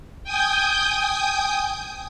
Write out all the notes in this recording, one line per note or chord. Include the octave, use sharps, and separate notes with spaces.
G5 G#5 D#6 G6